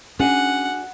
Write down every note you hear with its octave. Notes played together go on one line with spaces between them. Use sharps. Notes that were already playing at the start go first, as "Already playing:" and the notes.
C#4 D4 F#4 G#4 F#5